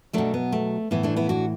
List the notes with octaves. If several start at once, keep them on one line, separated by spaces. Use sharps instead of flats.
B2 F#3 A3 D4
B3
A3
A2 E3 B3
A3 D4
B3 E4
D4 F#4